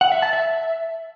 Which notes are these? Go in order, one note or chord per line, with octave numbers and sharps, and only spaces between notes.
F#5
E5
A5
E5